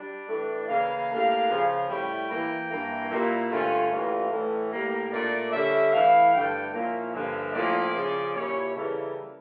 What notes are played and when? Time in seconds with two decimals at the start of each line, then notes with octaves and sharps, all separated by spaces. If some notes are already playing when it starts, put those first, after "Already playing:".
Already playing: G3 D4 D5
0.28 A2 E3 A3 D4
0.68 C#3 E3 A#3 E4 F5
1.09 A2 G3 A#3 D4
1.49 C#3 F3 C#4
1.89 A2 G3 C#4 E4 G5
2.30 E3 A#3 E4
2.70 G2 E3 A#3 C#4 E4
3.10 A#2 G3 A#3 E4 E5
3.51 G2 D3 A3 C#4 F4
3.91 A2 E3 G3 A#3 C#4 F4
4.31 A2 E3 A3 C#4 E4 A4
4.72 A2 G3 A#3 A#4
5.12 A#2 A3 D4 D5
5.52 D3 G3 C#4 E5
5.93 E3 A3 E4 F5
6.33 G2 D3 A3 G5
6.73 A#2 F3 A#3 C#4 E4 F5
7.14 G2 D3 F3 A#3 C#4 E5
7.54 A2 F3 A#3 C#4 E4 D5
7.94 C#3 F3 C#4
8.35 A#2 G3 C#4 E4 C#5
8.75 C#3 E3 G3 A#3 E4 A4